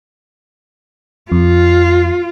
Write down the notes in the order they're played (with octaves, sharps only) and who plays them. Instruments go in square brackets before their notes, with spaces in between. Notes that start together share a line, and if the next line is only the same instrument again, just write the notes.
[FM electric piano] F2 [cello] F4